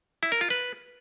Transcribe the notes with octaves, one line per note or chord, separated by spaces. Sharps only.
E4
A#4
F4
B4